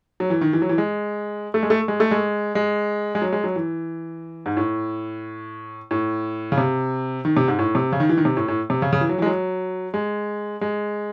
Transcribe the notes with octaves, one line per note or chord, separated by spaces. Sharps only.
F#3
E3
D#3
E3
F#3
E3
G#3
A3
G#3
A3
G#3
A3
G#3
G#3
G#3
F#3
G#3
F#3
E3
G#2
A2
A2
C#3
C3
D#3
C3
G#2
A2
C3
C#3
D#3
E3
D#3
C3
A2
A2
C3
C#3
C#3
E3
F#3
E3
G#3
F#3
G#3
G#3